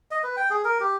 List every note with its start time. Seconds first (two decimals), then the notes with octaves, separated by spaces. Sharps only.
0.11 D#5
0.23 B4
0.37 G5
0.50 G#4
0.64 A#4
0.80 G4